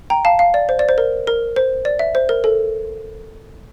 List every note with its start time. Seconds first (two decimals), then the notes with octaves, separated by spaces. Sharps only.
0.10 G5 A#5
0.25 F5 A5
0.39 F5
0.54 D5
0.69 C5
0.79 D5
0.89 C5
0.98 A#4
1.27 A#4
1.56 C5
1.85 D5
1.99 E5
2.15 C5
2.29 A#4
2.44 A4